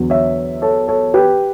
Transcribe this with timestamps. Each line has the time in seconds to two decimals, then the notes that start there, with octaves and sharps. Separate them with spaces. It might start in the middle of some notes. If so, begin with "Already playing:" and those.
Already playing: E2 D3 F#3 B3
0.10 C#5 E5
0.62 A4 C#5
0.88 A4 C#5
1.14 G4 B4